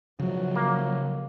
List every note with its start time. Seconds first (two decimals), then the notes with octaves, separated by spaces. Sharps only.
0.20 C#3 F3 F#3
0.55 A#3